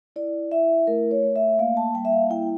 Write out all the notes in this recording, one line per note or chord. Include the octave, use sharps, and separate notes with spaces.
E4 D5
E4 E5
A3 A#4
C#5
A3
E5
A#3 F5
A5
G3 G5
E5
F5
E4 G5